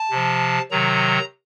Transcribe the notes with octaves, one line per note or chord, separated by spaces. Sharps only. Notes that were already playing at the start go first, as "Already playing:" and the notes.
Already playing: A5
C3 F3
C3 D#3 F#3 A#5